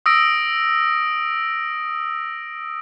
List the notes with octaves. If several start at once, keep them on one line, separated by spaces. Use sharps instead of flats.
D#6 E6 A#6 D7